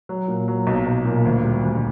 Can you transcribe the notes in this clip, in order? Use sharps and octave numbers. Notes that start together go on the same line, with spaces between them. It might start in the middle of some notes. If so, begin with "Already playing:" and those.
F#3
A#2
F#3
B1
B1
A#2
D2
G3
D2